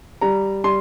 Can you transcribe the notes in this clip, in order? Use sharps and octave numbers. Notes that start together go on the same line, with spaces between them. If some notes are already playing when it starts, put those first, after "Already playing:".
G3 A#5
G3 C6